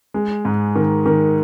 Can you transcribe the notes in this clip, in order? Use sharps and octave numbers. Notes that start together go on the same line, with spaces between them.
G#3
G#2
D#3
D#3